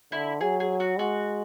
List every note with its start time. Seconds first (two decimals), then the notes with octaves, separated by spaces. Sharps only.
0.12 D3 E4
0.41 F#3 G#4
0.60 G#4
0.80 F#4
0.98 G#3 F#4